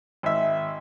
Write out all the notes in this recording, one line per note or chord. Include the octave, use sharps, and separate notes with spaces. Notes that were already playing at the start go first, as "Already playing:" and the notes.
G#1 E5